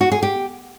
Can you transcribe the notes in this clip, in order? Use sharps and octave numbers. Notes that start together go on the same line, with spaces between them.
F#4
G#4
G4